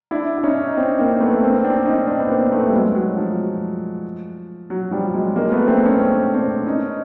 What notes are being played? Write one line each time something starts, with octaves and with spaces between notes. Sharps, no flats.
D4 E4
E4
C#4 D#4
D#4
C4 D4
A#3 C4
A3 B3
A#3 C4
C4 D4
C#4 D#4
C4 D4
B3
A#3 C4
A3 B3
G3
F#3 G#3
F#3
F3
F#3
F3 G3
F#3 G#3
G#3 A#3
A3 B3
A#3 C4
B3 C#4
C4 D4
C4 D4
C#4 D#4